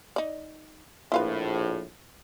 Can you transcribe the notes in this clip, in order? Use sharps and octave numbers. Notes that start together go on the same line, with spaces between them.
D#4 D5
A#1 A2 E4 F4 B4